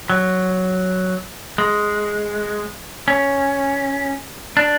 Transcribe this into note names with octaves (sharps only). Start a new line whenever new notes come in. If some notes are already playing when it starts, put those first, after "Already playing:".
F#3
G#3
C#4
D4